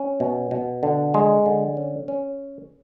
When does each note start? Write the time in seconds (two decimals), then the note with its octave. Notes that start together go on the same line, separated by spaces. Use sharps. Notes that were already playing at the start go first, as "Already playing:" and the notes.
Already playing: C#4
0.20 B2
0.51 B2
0.83 D3
1.14 G#3
1.46 D3
1.77 C#4
2.08 C#4